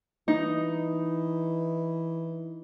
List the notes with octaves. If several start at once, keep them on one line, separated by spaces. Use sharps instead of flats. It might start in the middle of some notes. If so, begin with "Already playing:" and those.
E3 D#4